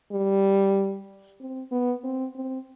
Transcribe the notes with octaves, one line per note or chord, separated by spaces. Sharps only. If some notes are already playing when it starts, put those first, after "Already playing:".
G3
C4
B3
C4
C4